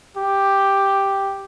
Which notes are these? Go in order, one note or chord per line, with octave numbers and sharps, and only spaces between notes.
G4